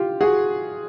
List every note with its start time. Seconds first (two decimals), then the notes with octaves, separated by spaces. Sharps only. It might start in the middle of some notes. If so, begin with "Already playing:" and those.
Already playing: F4 G4
0.20 F#4 G#4